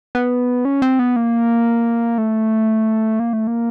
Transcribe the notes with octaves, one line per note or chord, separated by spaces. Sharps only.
B3
C#4
C4
B3
A#3
A3
A#3
A3
A#3